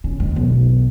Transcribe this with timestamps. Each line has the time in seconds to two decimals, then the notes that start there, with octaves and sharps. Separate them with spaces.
0.04 C#3
0.20 D#2
0.36 B1